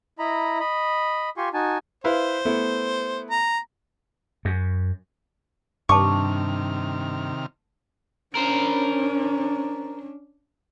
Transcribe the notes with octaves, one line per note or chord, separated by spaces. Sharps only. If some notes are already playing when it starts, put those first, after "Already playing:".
E4 D#5 A#5 B5
D#5 B5
F4 G4 G#5 C6 C#6
D#4 F#4 G#5 A5
E4 B4 C5 F5
A3 B3 E4
A#5
F#2
G2 C3 D#3 A5 C#6 D6 F6
C#4 D4 A#4 C5